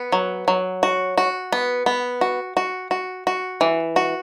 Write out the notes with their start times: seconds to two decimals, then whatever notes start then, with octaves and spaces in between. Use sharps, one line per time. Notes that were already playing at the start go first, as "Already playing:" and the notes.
Already playing: B3
0.12 F#3
0.48 F#3
0.83 F#4
1.18 F#4
1.52 B3
1.86 B3
2.21 F#4
2.57 F#4
2.91 F#4
3.27 F#4
3.61 E3
3.96 F#4